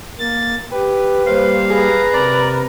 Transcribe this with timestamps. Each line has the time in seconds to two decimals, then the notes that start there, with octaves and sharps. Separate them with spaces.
0.19 A#3 A6
0.72 G4 B4
1.26 G3 A#3 C5 F5
1.70 G#4 B4 A#5
2.13 C3 A#4 D5